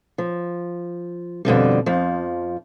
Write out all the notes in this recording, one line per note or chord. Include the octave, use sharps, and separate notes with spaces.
F3
F2 B2 D3 G3
F2 F3